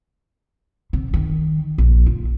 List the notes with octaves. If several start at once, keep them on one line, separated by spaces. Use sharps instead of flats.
C3
D#3
A#1
F4